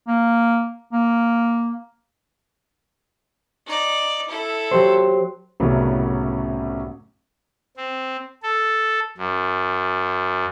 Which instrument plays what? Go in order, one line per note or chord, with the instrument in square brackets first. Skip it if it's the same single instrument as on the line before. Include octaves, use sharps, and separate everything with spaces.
[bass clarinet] A#3
A#3
[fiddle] D#4 D5
E4 A4
[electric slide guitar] F#3 G4 C5
[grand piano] C2 F#2 A2 C#3 F#3 B3
[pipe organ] C4
A4
F#2